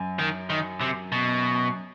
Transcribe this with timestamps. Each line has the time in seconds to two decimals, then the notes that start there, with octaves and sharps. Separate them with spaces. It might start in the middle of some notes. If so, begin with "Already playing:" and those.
Already playing: F#2
0.19 D#3
0.50 D#3
0.81 C3
1.12 B2